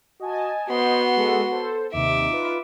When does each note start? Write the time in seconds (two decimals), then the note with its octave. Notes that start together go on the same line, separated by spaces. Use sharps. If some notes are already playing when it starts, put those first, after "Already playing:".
0.20 F#4 D#5 G#5 A5
0.69 B3 F#4 C5 D#5 C6
1.16 G#3 A4
1.51 A4 C5
1.93 D#2 C3 D#4 E5 D6
2.29 F4 B4